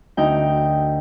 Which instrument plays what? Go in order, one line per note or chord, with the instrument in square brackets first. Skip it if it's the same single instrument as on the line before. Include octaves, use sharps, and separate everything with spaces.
[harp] D2 D#4 G5